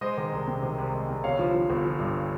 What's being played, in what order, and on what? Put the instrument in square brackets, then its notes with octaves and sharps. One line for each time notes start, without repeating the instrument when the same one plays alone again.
[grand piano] G#3 C5 D#5
D#3
C2
C3
D#3
C2
G#3
C2
G1 C#5 F5
F3
F3
G1
F3
G2